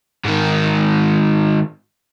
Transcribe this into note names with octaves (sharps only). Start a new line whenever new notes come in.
G#2 D#3